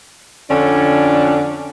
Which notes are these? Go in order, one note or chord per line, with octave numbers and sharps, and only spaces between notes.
F2 D3 C#4 D4